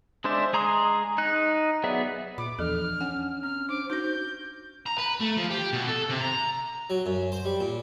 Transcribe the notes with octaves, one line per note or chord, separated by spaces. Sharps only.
G#3 D4 C5 D5 E5
G#3 G#4 A#5 C6 D#6
D#4 F#6
F#3 B3 G#4 D5 E5
A#2 B5 D6
E2 E3 F3 D4 A4 F6
C#4 F#5
C4 F6
D4 C5 D6
D#4 F#4 C5 G6
A#5
B4
A3
F3
G4
B2
A4
C3
A#5
F#3
F#2
C5
G3
A#2